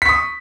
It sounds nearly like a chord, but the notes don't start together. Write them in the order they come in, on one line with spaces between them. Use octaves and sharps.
B6 C#6 D#6